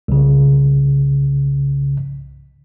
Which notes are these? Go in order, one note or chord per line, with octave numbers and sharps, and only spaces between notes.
C2 C#3